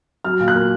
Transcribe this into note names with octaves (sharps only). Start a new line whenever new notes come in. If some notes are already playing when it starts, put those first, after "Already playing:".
F#3 F6
A#2
F#6
A#3